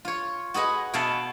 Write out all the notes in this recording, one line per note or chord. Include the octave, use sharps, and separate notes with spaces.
F4 C#5
F#4 G#4 B4 D#5 G#5
B2 B3 E5 F5 G#5 A5